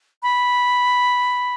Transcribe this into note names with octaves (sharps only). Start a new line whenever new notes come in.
B5